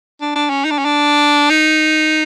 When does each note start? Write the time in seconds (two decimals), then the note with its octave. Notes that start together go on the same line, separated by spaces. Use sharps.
0.21 D4
0.36 D4
0.50 C#4
0.64 D#4
0.71 D4
0.78 C#4
0.85 D4
1.50 D#4